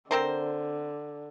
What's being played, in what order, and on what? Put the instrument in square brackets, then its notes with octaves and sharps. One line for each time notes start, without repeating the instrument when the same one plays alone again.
[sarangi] D3 [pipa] C4 A#4 C5